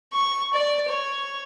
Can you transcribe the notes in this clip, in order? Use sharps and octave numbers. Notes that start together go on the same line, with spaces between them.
C#6
D5
C#5